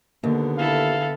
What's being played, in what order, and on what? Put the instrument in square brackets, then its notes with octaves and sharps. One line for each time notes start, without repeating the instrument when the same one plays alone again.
[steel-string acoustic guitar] D#2 [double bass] D3 B3
[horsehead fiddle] E4 A4 [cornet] F5